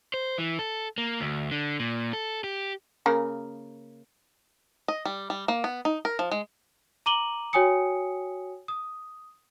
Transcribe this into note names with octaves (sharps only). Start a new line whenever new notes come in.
C5
E3
A4
A#3
D2
D3
A#2
A4
G4
C#3 A#3 A#4
D#5
G3
G3
A#3
B3
D#4
A#4
F3
G#3
A#5 D6 D#7 F#7 G7
F#4 C#5 G5 G#5 D#6 C#7
D#6